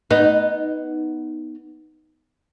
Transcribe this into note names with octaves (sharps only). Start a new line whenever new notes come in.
B3 D#4